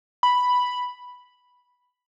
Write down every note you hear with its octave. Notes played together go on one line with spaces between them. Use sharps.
B5